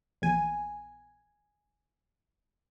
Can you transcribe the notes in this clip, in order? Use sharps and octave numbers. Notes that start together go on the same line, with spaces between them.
A#1 E2 G#5